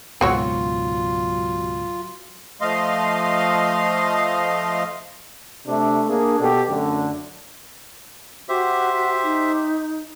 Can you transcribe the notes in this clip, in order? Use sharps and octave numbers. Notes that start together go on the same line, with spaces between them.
C#2 G#2 B2 F#3 C4 F4 F#4 C#5
F3 A3 D#5 F5 C6
C3 A3 D4
A#3 D4 G#4
B2 G4 A4
F#2 D3 A3
F#4 G4 C5 E5
D#4